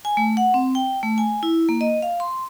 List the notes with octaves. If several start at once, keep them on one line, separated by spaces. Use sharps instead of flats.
G#5
A3
F#5
C4
G5
A3
G#5
E4
A#3
D#5
F5
C6